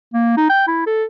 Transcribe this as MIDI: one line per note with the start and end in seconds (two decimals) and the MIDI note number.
0.13 0.32 58
0.37 0.48 63
0.50 0.64 79
0.67 0.84 64
0.86 1.04 69